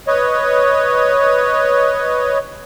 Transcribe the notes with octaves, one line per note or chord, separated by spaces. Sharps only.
B4 C#5 D#5